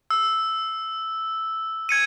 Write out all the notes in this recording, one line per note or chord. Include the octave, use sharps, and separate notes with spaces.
E6
G#6 C#7 D#7